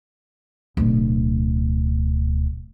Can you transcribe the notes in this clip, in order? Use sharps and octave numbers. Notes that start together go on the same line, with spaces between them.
D1 B2